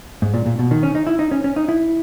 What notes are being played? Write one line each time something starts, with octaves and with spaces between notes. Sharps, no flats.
G#2
A#2
A#2
B2
D#3
C#4
D#4
E4
D#4
C#4
C#4
D#4
E4